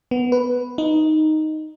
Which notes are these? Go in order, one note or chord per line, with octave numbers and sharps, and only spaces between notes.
B3
B4
D#4